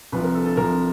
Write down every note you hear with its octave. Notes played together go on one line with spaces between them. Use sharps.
C2 C3 F3 B4
A#4
A4
A4
C2 C3 F3 A#4